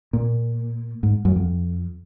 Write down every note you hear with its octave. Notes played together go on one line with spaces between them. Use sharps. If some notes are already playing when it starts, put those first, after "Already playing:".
A#2
G#2
F#2
F2